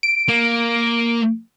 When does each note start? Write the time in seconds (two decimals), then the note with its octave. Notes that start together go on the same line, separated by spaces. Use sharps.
0.03 D7
0.28 A#3